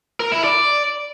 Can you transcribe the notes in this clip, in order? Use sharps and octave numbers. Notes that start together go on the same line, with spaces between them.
A#4
E4
D5